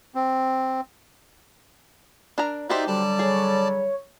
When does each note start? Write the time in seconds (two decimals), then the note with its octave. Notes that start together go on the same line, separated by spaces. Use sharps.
0.15 C4
2.38 D4 A#4 A#5
2.70 D#4 F#4 G4 C5 D5 E5
2.88 D3 F#3 G3 D5 A5
3.19 G#4 C#5